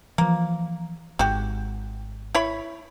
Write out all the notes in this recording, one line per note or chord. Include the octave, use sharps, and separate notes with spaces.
E3 F3 A#3
G#1 G#2 F#4 G4
E4 C#5 B5